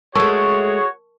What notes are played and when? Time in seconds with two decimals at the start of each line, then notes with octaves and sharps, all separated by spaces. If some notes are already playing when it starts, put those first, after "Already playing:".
0.15 G#3 A3 F#4 G#4 A#4 C#5 A5 C#6